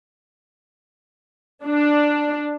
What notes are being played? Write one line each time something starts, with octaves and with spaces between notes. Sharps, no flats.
D4